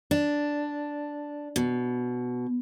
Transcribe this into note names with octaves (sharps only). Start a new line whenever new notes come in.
D4
B2